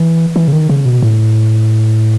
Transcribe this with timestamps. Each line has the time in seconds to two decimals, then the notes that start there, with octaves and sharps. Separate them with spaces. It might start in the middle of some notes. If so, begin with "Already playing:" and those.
Already playing: E3
0.36 E3
0.48 C#3
0.53 D#3
0.69 C#3
0.85 B2
1.02 A2